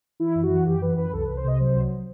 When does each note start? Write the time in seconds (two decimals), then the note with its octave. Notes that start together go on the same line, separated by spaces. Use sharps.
0.20 E3 E4
0.35 F#2
0.43 F#4
0.51 E3
0.67 F#2 G4
0.82 E3 B4
0.97 F#2 B4
1.13 C2 A4
1.25 C2 B4
1.37 C5
1.44 C3 D#5
1.60 F#3 C5
1.75 C2